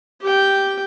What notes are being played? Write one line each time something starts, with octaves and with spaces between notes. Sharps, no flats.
G4 G5